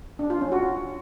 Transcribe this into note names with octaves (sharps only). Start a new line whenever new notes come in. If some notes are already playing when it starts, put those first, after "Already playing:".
D4
F4
C#4
F#4